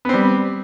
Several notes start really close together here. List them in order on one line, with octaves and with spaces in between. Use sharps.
B3 C4 G3